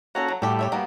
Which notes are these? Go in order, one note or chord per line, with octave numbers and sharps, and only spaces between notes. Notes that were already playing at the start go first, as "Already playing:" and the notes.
A#3 C#4 F#4 A4 C#5 A#5
F#3
A2 G3 F#4 G4 A5
G4 C#5 E5
G3 A#3 B3 F#4